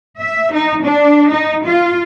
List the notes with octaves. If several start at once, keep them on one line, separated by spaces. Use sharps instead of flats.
E5
D#4
D4
D#4
F4